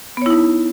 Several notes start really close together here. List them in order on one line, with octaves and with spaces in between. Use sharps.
B3 C#5 E4 D#4